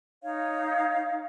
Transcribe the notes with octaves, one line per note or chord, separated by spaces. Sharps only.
D#4 C#5 F5